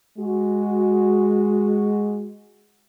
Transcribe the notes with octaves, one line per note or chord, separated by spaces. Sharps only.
G#3 F#4